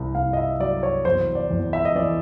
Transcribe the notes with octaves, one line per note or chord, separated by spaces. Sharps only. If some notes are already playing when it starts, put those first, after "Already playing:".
Already playing: C2
C2 F5
D#5
E5
F#3 D5
C#5
E2 C5
D5
E2
E5
D#5
E3 D5